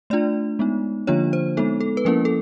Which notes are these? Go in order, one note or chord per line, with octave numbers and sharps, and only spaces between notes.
A3 D4 F4 D5
G#3 B3 D#4
D3 F3 A#3 D4 F4 C#5
C5
G#3 B3 D#4 A4
A4
B4
F3 A#3 C#4 E4 A#4
A4